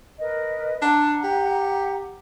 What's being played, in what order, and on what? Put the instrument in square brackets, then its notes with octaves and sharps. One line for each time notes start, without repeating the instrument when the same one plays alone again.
[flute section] A#4 B4 D#5
[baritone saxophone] D4 [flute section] F#5 A#5
[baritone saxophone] G4